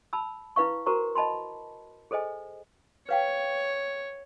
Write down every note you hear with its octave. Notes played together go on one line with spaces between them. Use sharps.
A5 B5 E6
E4 B4 F5 C#6
F#4 A#4 C5 A#5 C#6
D#5 A5 B5 C6
G#4 A4 C5 D#5 G#5
B4 C#5 F5 G5